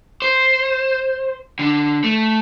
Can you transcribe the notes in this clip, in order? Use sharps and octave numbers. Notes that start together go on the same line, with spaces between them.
C5
D3
A3